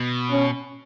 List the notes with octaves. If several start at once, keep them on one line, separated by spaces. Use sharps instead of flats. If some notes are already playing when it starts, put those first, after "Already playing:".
Already playing: B2
C#4